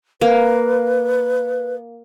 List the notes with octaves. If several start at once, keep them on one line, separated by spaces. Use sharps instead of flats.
A#3 B4